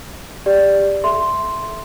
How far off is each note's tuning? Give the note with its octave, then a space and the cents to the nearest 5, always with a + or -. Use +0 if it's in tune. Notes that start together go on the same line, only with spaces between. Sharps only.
G4 +20 D5 +0
A4 -30 E5 +0 C6 +0